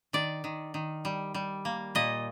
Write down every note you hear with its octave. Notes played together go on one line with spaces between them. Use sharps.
D#3 D5
D#3
D#3
G3
G3
A#3
A#2 D#5